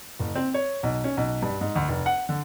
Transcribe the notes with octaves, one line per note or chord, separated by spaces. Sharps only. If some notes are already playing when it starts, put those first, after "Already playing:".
F#1
C4
C#5
B1
C#4
B1
G2
G#2
D2
F1
F#5
D3